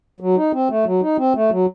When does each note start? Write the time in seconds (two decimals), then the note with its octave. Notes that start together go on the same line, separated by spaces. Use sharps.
0.20 F#3
0.37 D#4
0.53 C4
0.70 A3
0.85 F#3
1.02 D#4
1.18 C4
1.35 A3
1.51 F#3